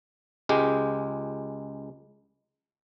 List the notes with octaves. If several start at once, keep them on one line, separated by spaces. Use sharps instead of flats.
C#2 G#3 G4